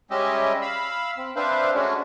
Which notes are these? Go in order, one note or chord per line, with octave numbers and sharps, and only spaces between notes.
G3 G#3 C#4 G4 D#5 E5
F5 B5 E6
C4
C4 D4 B4 C5 E5 F5
G#3 A3 C#4 D4 F#4